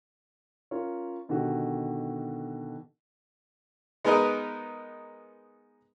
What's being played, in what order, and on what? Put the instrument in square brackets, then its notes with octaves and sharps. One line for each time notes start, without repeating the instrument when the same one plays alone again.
[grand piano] C#4 F4 A#4 C#5
B2 D3 D#3 F#4 G4
[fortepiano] G#3 B3 D#4 A#4 B4 D#5